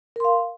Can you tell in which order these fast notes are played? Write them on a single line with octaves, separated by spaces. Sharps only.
A#4 C6 F5